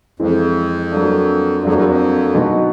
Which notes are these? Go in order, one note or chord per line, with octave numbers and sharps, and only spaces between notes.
F2 E3 G#3 C4
F#3 A#3 D4
F2 F#3 A#3 D4
E2
F2
B2 F#3 B3 D#4 F#4